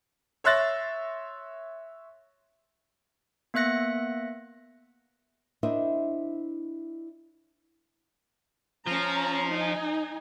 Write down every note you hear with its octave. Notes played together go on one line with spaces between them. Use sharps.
C#5 E5 C6 F#6 A6 A#6
A#3 B3 E5 F#6 A#6 C#7
D4 E4 A#4 C5 D#5 E5
F3 C#4 A#5
D#4 G#5